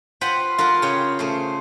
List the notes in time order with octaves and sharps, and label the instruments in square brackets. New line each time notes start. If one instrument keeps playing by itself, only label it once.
[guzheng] F4 B4 C5 F#5 G5 B5
F4 A#4 B4 F#5
C#3 C#5 G5
C#3 A3 C5